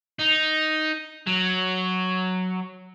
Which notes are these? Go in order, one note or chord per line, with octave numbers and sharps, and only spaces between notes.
D#4
F#3